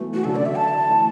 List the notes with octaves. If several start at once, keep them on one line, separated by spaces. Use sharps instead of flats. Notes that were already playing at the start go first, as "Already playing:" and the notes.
Already playing: E3 F#3 A3 B3
E3 F#4
D3 F#3 A4
D5
E5
A5
E3 A3